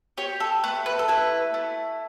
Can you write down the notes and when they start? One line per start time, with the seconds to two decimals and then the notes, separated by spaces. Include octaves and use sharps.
0.18 G4 C#5
0.40 A4
0.64 A3 B4
0.86 B4
0.99 A4
1.08 E4 B4
1.54 A3